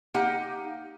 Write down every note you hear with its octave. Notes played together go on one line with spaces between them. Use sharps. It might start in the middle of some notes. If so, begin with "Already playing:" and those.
A#3 D#4 G4 F#5